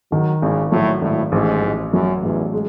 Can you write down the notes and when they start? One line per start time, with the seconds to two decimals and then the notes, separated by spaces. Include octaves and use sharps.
0.12 D#3 F#3
0.42 G#1 C#3
0.72 A2 F#3
1.02 G#1 A2
1.32 A1 G#2
1.63 A1
1.93 F#2 F#3
2.23 A1 E2
2.53 G#3